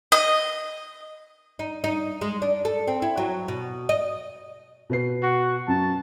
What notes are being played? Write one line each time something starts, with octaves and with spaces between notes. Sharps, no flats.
D#5
D#4
D#4
G#3
D4
A4
C4
E4
F#3
B2
D#5
B2 B4 C7
F#4
F#2 A5